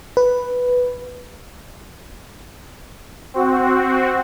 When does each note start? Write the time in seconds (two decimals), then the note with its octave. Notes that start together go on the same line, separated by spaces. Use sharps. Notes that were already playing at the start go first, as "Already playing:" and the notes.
0.17 B4
3.34 C4 F#4